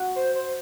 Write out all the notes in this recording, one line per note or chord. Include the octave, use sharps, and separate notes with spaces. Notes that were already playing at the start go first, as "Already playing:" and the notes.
Already playing: F#4
C5
C5